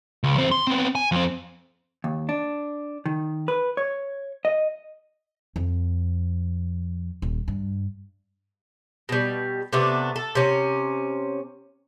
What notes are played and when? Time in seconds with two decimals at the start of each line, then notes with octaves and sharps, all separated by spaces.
0.24 C#2
0.37 E2 C4
0.52 C6
0.67 B3 C4
0.95 G#5
1.12 F2 C4
2.04 D#2
2.29 D4
3.06 D#3
3.48 B4
3.77 C#5
4.45 D#5
5.56 F2
7.22 D#1
7.48 G2
9.09 B2 G3
9.73 C3 A3 B3 D4
10.16 A4
10.35 C3 C#4